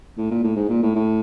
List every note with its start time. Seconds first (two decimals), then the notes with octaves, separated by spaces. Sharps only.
0.18 A2
0.31 A#2
0.43 A2
0.56 G#2
0.69 A#2
0.83 A2
0.95 A2